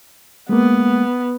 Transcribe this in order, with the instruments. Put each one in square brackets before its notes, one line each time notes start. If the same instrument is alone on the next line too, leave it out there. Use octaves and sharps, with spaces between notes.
[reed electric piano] G#3 A#3 [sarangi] B3